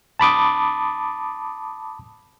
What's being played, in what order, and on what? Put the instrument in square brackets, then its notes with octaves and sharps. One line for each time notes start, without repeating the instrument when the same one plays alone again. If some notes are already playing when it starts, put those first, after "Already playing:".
[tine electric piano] A5 B5 D6 D#6